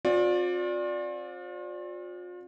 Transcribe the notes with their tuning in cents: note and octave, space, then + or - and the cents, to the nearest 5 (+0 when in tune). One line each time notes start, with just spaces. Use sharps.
C4 +35 F4 +40 D5 +0